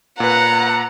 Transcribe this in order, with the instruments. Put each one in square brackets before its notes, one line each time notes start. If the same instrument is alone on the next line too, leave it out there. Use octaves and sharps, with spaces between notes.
[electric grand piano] A#2 B4 [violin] F#5 [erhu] A#5